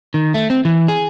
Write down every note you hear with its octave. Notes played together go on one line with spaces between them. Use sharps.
D#3
A3
C4
E3
G#4